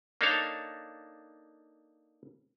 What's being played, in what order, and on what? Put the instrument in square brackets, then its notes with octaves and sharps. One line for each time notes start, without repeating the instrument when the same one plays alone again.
[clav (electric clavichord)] A#3 D4 D#4 A4 C#5 F5